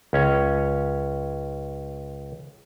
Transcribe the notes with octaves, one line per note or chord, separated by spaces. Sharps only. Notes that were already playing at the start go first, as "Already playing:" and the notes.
C#2 C#4 C#5